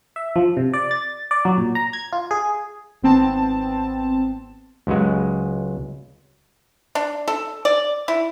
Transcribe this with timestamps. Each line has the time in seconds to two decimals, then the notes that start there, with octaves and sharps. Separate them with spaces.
0.16 E5
0.36 F3
0.57 C3
0.74 D5
0.91 A6
1.31 D5
1.45 F#3
1.58 A#2
1.75 A#5
1.93 G#6
2.13 F4
2.31 G#4
3.02 G#1 B3 C4 A5
4.87 C#2 F#3 G#3
6.95 D4
7.28 A4
7.65 D5
8.08 E4